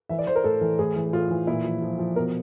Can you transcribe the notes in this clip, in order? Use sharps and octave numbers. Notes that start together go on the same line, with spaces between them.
E3 E5
D5
E3 C5
A#4
A2 A4
E3
A2 G#4
E3
A2 F4
E3
A#2 E4
F3
F3
F3
B2 A#4